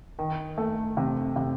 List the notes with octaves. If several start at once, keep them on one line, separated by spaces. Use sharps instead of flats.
D#3
A3
C3
C3